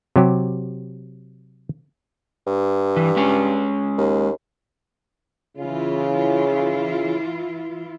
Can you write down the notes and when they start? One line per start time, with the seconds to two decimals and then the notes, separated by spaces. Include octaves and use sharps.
0.16 C3 F#3 G4
2.47 G2
2.96 E3
3.16 G#3 C#4 G#4
3.98 D#2
5.58 C#3 E3 E4 F4